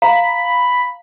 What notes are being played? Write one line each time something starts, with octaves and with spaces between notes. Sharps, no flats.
F5 A#5 B5